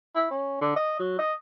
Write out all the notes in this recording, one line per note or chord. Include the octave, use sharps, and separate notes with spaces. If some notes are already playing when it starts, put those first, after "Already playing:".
E4
C#4
D3
D#5
F#3
D#5